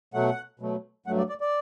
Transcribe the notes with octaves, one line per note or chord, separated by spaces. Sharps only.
B2 F#3 A3 F#5
B2 F#3 A3
G2 F#3 A3 F#5
D5
D5
D5